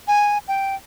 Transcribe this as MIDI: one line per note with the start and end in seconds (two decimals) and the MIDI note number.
0.08 0.38 80
0.48 0.75 79